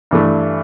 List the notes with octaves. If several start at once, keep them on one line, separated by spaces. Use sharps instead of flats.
G2 E3 A3